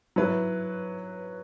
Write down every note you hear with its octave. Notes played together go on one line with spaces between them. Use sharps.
F#3 E4 B4